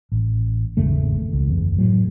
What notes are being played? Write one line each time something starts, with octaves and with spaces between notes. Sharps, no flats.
A1
G#1 E2 C#3 A3
C#2
F#1 E2
A2 F#3